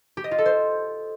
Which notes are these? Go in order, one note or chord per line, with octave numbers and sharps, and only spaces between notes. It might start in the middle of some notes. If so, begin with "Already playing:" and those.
G4
D#5
F4
A4
C5